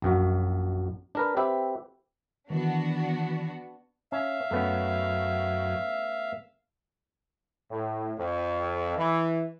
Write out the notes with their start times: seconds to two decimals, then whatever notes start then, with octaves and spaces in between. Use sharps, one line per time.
0.02 A#1 F#2 F#4
1.15 D4 A#4 B4
1.37 C4 G4 B4 E5
2.50 D#3 E3 B3 D4 F#4
4.12 C#4 E5 F5
4.51 F#2 A3 B3 C#4
7.71 A2
8.18 F2
8.97 E3